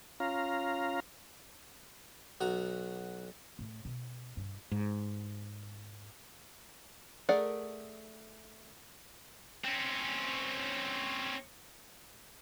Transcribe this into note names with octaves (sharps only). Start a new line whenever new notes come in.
C#4 F4 F5 A#5
B1 F#4 A#5
A2
B2
G2
G#2
A3 G#4 A#4 D5 F#5
C4 C#4